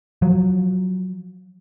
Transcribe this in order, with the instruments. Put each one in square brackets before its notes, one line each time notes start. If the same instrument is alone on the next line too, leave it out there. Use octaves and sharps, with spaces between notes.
[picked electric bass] F3 F#3